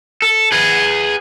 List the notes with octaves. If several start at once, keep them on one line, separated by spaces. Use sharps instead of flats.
A4
G#4 B4